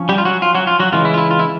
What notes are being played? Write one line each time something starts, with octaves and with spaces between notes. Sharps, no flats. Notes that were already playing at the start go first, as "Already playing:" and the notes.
Already playing: F3 C#4
G3 G4
F4
F#3 F#4
F4
F#3 F#4
F4
F#3 F#4
C#3 E3 G#3 F4
E4
F4
E4
F4
E4